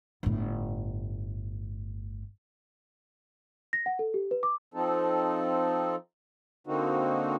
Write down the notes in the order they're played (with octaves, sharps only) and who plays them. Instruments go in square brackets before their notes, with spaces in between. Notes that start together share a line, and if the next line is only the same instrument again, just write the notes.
[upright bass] G1 A2
[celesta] A#6
F#5
A4
G4
B4
D6
[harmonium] F3 C4 D#4 A4
D3 A#3 C4 D#4 F#4